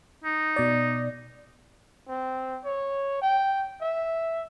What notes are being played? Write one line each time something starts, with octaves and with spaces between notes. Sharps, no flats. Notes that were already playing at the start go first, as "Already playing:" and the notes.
D#4
B2 D5
C4
C#5
G5
E5